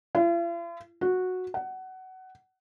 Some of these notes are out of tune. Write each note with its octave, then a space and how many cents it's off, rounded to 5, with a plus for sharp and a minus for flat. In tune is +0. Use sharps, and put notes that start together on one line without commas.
F4 -45
F#4 -10
F#5 +20